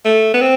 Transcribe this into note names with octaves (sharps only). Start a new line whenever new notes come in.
A3
B3
C4